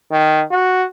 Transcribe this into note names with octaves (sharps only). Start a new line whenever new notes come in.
D#3
F#4